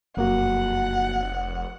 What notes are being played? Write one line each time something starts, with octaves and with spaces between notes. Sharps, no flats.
F1 F#2 A#3 F#4 F#5